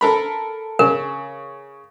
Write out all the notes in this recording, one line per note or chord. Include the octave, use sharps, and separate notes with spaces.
A4 A#4 B5
C#3 A#4